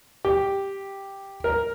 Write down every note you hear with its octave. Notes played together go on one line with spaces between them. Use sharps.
G4
A#4